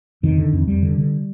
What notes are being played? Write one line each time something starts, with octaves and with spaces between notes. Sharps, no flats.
F2 D#3
D3
F2
F2 G3
D3
D3